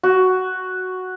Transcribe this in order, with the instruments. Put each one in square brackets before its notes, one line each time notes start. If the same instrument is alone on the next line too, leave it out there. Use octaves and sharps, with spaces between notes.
[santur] F#4